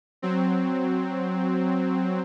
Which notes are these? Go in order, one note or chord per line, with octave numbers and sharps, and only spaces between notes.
F#3 C4